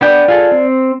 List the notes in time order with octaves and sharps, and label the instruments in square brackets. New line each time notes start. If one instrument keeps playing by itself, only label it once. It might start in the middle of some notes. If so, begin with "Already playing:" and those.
[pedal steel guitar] B3 D4 G5 [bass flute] D5
[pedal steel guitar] F4 G#4 A4
C4